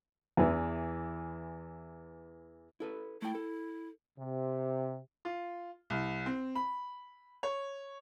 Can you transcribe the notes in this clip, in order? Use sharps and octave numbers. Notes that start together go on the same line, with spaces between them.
E2 E3
E4 A4 B4
A3 E4 G5
A4
C3
F4
C2
C4
B5
C#5